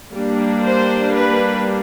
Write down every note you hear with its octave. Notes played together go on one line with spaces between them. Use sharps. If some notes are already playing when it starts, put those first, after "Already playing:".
G3 A#3 D4
C5
B4